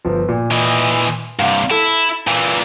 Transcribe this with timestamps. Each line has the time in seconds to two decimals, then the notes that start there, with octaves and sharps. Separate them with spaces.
0.05 G1 F3
0.28 A#2
0.51 E3 D#5
1.39 G2 C3 F5 F#5
1.71 E4 A4
2.27 A#2 E3